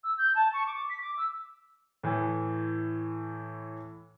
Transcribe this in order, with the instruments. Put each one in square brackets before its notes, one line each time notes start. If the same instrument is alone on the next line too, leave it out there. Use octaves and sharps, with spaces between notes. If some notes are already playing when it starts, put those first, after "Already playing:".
[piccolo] E6
G6
A5
C#6
D6
B6
D6
E6
[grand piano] A2 E3